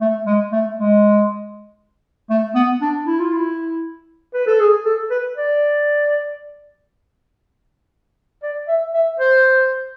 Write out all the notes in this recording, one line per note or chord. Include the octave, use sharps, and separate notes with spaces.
A3
G#3
A3
G#3
A3
B3
D4
E4
F4
E4
B4
A4
G#4
A4
B4
D5
D5
E5
E5
C5